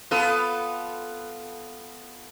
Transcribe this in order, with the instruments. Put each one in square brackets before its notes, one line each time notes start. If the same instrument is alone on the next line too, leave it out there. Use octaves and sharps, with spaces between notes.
[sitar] B3 F4 A4